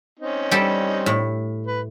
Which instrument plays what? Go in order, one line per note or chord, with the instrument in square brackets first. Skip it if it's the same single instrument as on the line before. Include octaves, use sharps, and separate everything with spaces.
[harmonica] C4 C#4 D#4
[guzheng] G3 G4 A4
A2
[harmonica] B4